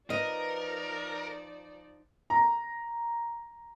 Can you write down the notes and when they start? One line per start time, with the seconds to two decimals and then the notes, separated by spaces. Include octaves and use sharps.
0.10 F3 D#4 A#4 B4 D5 D#5
2.30 A#5